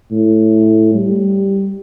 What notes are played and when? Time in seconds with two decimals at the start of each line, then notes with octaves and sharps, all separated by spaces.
0.11 A2
0.94 G3